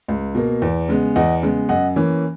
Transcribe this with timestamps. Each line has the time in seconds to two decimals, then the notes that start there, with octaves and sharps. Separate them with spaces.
0.08 C#2
0.35 B2 A#3
0.62 E2
0.89 C#3 G#3 B3
1.16 E2 D#5 F#5
1.43 C#3 G#3 B3
1.69 F#2 D#5 F#5
1.96 E3 A#3 C#4